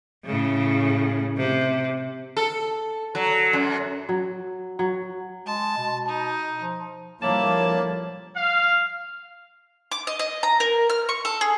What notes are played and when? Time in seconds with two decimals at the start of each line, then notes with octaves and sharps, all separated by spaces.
0.25 A2 C#3
1.37 C3
2.37 A4
3.15 F#3
3.53 F#2
4.09 F#3
4.79 F#3
5.46 G#3 A5
5.77 B2
6.08 D#4
6.60 F3
7.22 D3 F3 G3 A#3 E4 C#5 A5
8.35 F5
9.91 D6
10.07 D#5
10.19 D#5
10.43 A#5
10.60 A#4
10.90 F6
11.09 C#6
11.25 A4
11.41 G#4